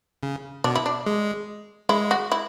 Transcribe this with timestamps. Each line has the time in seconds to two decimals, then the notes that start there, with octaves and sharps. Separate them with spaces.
0.23 C#3
0.64 B2 D4
0.75 E4
0.86 D4
1.06 G#3
1.89 G#3 E4
2.11 F#4
2.32 E4